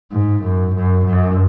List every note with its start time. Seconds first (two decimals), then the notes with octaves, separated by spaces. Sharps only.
0.12 G#2
0.43 F#2
0.75 F#2
1.06 F#2